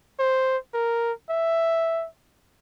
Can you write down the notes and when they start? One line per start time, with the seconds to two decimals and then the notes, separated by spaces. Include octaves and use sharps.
0.19 C5
0.74 A#4
1.29 E5